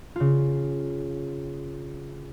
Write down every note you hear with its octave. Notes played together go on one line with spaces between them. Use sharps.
C#3 F4